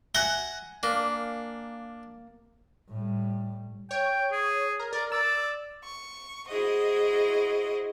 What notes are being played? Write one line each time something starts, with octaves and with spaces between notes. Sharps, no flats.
E5 F#5 G#5 A#5 F#6 G7
A#3 D4
A2 G3
C#5 G5
G#4
A#4
A#4 D5
D5 E6
C#6
E4 F#4 G#4 C5 D#5